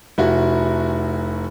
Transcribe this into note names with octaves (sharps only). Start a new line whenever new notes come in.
F1 E4 F#4